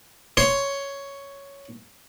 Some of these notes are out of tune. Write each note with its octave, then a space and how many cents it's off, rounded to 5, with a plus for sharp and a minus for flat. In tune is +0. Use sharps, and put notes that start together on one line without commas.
C#5 +5 C6 +0